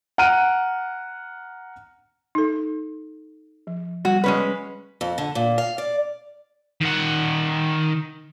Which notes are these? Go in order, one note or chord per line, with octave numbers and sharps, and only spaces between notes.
F#5 A#5 F6 D7 D#7
D#4 A4
F3
G3 F#4
G#3 C#4 B4
F2
D3
A#2
F5
D5
D#3 F#5